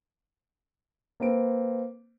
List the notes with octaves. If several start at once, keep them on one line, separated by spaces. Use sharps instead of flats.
A#3 C4 B4 D7